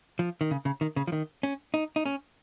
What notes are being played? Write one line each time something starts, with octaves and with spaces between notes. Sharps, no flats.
F3
D#3
C#3
C#3
D#3
C#3
F3
D#3
C#4
D#4
D#4
C#4